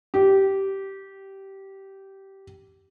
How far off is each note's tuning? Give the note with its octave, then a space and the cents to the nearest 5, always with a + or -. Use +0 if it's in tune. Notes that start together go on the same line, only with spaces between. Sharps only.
G4 -15